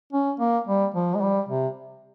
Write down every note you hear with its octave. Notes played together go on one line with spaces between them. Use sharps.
C#4
A#3
G3
F3
G#3
G3
C3